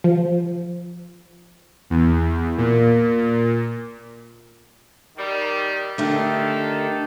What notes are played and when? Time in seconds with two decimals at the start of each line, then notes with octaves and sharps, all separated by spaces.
0.04 F3
1.90 E2
2.58 A#2
5.17 D#3 G3
5.98 D3 D#3 A3 G4 A4